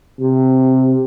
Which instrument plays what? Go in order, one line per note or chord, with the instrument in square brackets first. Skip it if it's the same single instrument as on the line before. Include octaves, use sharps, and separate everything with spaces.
[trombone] C3